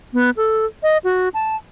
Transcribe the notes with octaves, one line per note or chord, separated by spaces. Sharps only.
B3
A4
D#5
F#4
A5